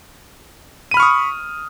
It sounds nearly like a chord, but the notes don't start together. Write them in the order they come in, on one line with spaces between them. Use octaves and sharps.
D#7 B5 F6 C#6 D#6